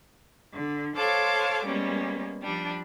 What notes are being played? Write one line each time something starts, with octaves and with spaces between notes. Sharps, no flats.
D3
A4 C5 C#5 F5 A5 D6
G3 G#3 A#3 B3 C#4
F3 G3 D4